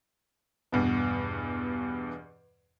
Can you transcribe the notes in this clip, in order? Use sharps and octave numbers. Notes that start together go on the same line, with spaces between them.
E2 G2 B2